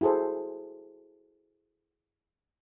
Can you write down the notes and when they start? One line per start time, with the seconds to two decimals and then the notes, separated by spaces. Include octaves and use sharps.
0.01 E4 F#4 G#4 A4 C5